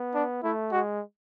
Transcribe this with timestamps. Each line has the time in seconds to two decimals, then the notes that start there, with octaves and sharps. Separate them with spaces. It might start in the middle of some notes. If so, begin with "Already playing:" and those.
Already playing: B3
0.15 D4
0.43 A3 E4
0.72 G#3 F#4